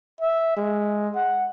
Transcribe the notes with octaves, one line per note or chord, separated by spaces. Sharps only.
E5
G#3
F#5